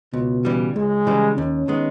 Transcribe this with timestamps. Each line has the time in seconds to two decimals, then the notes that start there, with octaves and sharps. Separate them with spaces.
0.13 C#2 B2
0.45 C#3 E3 G3
0.76 C#2 G#3
1.07 C#3 E3 G3
1.37 D#2 C#4
1.68 D#3 G#3 B3